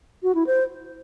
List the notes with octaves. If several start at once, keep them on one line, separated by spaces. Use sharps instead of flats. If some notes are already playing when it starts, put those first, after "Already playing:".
F#4
E4
C5